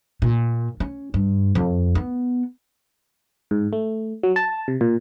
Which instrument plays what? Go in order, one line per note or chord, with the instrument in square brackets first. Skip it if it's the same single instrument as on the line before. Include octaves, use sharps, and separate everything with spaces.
[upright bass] A#2
C#4
G2
F2
B3
[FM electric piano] G#2
A3
F#3
A5
C3
A#2